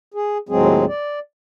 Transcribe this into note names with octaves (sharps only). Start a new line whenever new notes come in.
G#4
D#2 A2 F#3 G#3 C4 G#4
D5